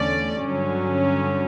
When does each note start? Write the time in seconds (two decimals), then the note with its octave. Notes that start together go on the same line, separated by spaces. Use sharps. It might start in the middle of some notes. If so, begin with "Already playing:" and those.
Already playing: E2 D3 A3 C#4 D5
0.40 G2 D3 F#3 C#4